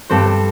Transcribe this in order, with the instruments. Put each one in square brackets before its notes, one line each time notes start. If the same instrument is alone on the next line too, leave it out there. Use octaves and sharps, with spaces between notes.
[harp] G2 G3 C4 A4 C5